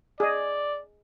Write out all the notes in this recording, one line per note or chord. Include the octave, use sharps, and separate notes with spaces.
G#4 D5 D#5